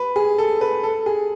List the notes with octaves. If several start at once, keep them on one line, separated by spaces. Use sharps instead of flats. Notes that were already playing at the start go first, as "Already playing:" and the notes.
Already playing: B4
G#4
A4
B4
A4
G#4